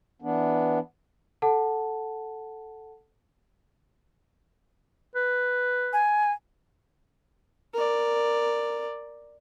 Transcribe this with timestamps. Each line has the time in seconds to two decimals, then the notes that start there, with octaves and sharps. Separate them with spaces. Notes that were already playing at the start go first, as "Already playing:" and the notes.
0.22 E3 B3 D4
1.42 A4 F#5 A5
5.15 B4
5.93 G#5
7.74 A#4 D5